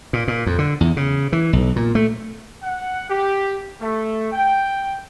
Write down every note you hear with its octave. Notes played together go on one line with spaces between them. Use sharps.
A#2
A#2
F2
D3
E2
C#3
E3
B1
A#2
A3
F#5
G4
A3
G5